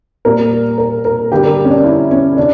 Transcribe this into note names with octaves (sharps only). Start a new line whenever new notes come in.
A#2 G3 A#4
A#4
A#4
G2 D3 G3 G4
A#4
C#4
D4
E4
C#4
C#3 G3 D4